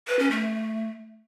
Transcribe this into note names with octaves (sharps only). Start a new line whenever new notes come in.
B4
C#4
A3